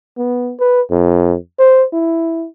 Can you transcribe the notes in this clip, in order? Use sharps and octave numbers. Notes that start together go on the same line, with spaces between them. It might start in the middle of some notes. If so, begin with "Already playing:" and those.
B3
B4
F2
C5
E4